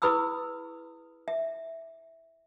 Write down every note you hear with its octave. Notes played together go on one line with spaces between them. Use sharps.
E4 G#4 B4 B5 D#6 E6
E5